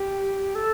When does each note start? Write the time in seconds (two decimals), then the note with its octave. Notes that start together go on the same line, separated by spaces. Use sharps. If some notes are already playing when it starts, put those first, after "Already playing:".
Already playing: G4
0.55 A4